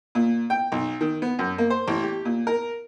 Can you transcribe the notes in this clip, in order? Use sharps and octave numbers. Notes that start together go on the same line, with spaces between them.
A#2
G5
B1
D#3
B3
F#2
A#3
C5
A1
G4
A#2
A#4